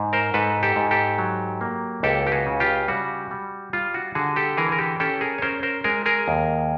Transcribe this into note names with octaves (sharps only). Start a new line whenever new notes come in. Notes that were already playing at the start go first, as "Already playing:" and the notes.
Already playing: G#2
A#4 C5
G#2 A4 B4
G4 A4
G#2
G4 A4
F#3
A#3
C#2 G4 A4
G4
F#4 G#4
C#3
F4 G4
G3 F#4
G3
G3 F4
F#4
D3 F#4 G#4
G4 A4
E3 G#4 A#4
A#4
G4 A4
C#4 G4 A4
G#4 A#4
C#5
C#4 A#4 C5
A#4 C5
G#3 G#4 A#4
G#4 A#4
D#2